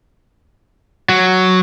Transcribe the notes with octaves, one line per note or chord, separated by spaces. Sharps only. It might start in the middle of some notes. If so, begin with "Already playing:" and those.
F#3